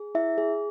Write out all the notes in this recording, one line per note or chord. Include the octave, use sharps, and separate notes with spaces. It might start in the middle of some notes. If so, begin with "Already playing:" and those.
Already playing: G#4
E4 E5
G#4